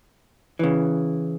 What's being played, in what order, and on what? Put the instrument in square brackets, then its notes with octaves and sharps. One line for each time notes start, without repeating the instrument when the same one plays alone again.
[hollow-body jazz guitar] C#3 E3